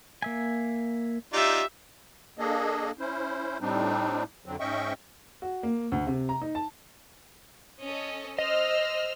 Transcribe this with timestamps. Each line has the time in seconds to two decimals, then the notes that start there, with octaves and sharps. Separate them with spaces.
0.22 A#3 E5 G#5
1.33 D#4 F4 G4 D5 E5
2.39 A#3 D4 G#4 A4 D#5
2.99 C#4 E4 C5
3.61 A2 G3 C4 D4 D#4
4.46 F2 D3 F#3 C4
4.60 G#2 C#4 D#5 E5 G5 C#6
5.42 F#4
5.63 A#3
5.92 D2
6.07 C3
6.29 A#5
6.42 D#4
6.55 A5
7.83 C#4 A4 D#5
8.38 C5 D#5 E6 F6